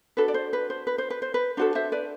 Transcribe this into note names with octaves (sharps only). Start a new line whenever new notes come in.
D4 F#4 A4 B4
D5
C5
B4
C5
B4
C5
B4
C5
B4
D4 F#4 A4 C5
C5 E5
B4 D5